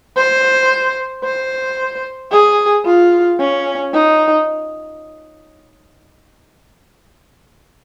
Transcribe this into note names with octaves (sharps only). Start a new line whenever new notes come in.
C5
C5
G#4
F4
C#4
D#4